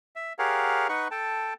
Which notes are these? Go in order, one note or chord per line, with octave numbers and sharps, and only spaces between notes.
E5
G4 G#4 A#4 C#5 F5 F#5
D#4 B4 F#5 C#6
A4 G5 A5